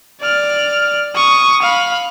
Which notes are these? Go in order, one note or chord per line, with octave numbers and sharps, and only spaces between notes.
D5 F6
C#6 D#6
F5 B5